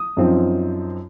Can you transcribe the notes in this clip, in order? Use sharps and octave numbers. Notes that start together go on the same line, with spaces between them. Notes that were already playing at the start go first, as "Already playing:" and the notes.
Already playing: D#6
F#2 F3 C4 D#4